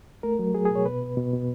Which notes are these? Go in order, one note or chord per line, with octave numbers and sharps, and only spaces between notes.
A3 A#4
F#3
F#3 G#4
G#4
B2
C#5
B2 B4
B2
B2
B2